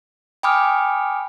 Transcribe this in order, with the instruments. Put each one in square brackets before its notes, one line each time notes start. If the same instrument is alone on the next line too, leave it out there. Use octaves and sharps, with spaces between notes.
[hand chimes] G5 G#5 B5 D6 D#6 F6